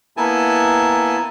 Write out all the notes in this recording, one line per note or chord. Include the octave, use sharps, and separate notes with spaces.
A#3 B3 E4 G#5 A5